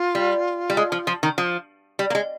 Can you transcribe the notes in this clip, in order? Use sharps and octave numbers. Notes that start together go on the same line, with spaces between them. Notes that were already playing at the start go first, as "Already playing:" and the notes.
Already playing: F4
G3
G3
G#3
F3
F3
D#3
F3
G3
A#3
G#3